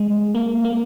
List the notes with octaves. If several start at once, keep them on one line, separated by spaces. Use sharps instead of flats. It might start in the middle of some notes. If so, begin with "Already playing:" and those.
Already playing: G#3
A#3
A#3